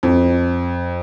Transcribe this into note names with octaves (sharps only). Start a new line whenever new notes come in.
F2